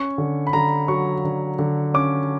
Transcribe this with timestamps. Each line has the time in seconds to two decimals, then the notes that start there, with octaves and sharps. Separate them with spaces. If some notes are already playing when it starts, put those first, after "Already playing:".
Already playing: C#4 C#6
0.18 D3
0.47 B5
0.53 D3 A#5
0.88 F#3 C#6
1.24 D3
1.59 D3
1.94 C#4 D6